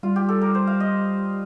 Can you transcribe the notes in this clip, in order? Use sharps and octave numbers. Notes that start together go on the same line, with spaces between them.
G3 F4
G4
A4
A#4
C5
F5
D#5